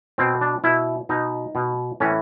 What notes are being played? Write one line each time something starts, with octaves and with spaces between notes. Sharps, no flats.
B2 C4
D4
B2 E4
B2 D#4
B2
A2 E3 C#4